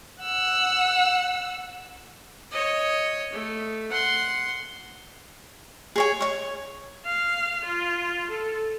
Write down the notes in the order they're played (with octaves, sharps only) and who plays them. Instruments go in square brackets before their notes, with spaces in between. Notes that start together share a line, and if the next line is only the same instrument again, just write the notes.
[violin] F#5 E6
[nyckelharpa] C#5 D#5
A3
F#5 C6
[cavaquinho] G#4 C#5 G#5
C#5 C#6
[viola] F5
F4
A4